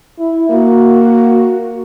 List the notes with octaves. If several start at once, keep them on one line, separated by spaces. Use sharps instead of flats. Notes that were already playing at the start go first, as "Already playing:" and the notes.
E4
A#3 F#4